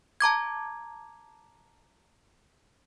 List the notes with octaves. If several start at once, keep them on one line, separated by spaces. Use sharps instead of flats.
A5 A#5 D6 G#6